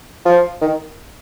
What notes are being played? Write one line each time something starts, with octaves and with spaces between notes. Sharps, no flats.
F3
D#3